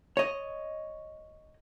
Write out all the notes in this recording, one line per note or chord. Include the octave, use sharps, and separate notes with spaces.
C#5 D#5